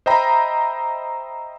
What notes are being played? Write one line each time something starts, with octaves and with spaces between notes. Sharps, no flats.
C5 D#5 E5 G5 A#5 B5